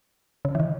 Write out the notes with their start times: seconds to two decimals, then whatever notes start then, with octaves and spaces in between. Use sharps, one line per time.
0.45 C#3
0.55 E3
0.60 D#3